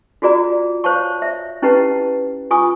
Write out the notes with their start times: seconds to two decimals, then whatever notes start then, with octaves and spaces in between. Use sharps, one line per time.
0.22 F4 F#4 G#4 D5 A#5
0.84 C5 C#5 F5 A5 C#6
1.22 E5
1.62 C#4 E4 G4 B4 F#5 A5
2.51 F4 G#5 C#6 D#6